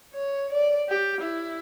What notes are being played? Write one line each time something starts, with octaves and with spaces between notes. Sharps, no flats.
C#5
D5
G4
E4